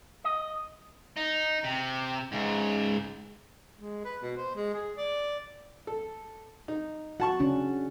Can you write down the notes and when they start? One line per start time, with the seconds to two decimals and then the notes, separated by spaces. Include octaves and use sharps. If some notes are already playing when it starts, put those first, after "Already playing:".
0.24 D#5
1.17 D#4
1.64 C3
2.32 G#2 C#3
3.76 G#3
4.05 B4
4.22 B2
4.37 C5
4.55 G#3
4.74 G#4
4.97 D5
5.87 A4
6.68 D#4
7.20 F#4 F#5 A5 C#6
7.40 C#3 C#4 D4